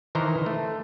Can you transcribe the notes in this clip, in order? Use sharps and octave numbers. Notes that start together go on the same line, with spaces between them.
D#3 E3 C5 A#5
A3